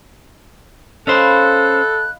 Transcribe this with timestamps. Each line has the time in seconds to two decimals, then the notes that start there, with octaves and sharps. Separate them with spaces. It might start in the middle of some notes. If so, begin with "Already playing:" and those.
1.07 C#4 A4 C5 D#5 F5 B5 F#6